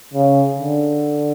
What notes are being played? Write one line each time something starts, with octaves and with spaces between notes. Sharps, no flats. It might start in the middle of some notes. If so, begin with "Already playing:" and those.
C#3
D3